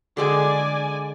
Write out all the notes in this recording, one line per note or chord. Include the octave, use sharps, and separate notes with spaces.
D3 G#3 D5 G#5 D6